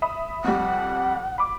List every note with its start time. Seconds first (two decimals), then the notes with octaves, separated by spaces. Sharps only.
0.02 E5 B5 D#6
0.44 F2 G3 F#5
1.38 B5 D6